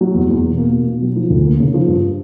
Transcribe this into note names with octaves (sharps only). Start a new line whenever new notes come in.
F#3
E2
E2
B2
A#3
B2
B2
F#3
F3
D2
A#3
C#3
F3
G2